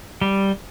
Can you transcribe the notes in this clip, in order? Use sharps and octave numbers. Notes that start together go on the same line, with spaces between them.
G3